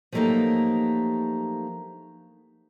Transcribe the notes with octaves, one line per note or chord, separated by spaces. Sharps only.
F3 F#3 A3 A#3 D#4 G4